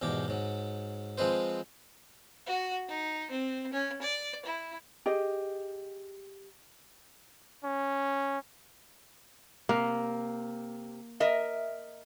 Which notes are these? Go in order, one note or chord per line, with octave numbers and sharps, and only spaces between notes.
E2 G#2 B2 G4
G#2 F#3
F3 G#3 C4 B4 C5
F#4
D#4
C4
C#4
D5
E4
G4 G#4 D#5
C#4
C3 A#3
A#4 D#5 E5